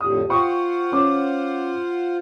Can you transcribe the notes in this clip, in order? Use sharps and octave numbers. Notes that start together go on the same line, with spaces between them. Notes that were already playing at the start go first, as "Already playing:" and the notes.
F2 A2 D3 G4 D#6
F4 C5 F#5 G5 C#6 D#6
C#4 D6